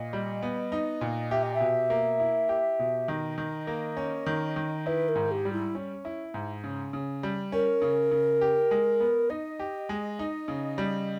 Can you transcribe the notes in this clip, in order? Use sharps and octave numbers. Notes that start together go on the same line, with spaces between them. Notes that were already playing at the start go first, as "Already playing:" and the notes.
Already playing: A#2 D#5
G3
B3
D#4
A#2
G4 E5
D#5
E5
B2
A#3
E4
G4
B2
D#3 D#5
D#3
A#3
C#4
D#3
D#3
E4 B4
A#4
G#2
G4
G3
E4
C#4
E4
G#2
C#3
C#3
G3
C#4 A#4
C#3
C#3
G4
G#3
B3
D#4 D#5
G4
G#3
D#4
C#3
G3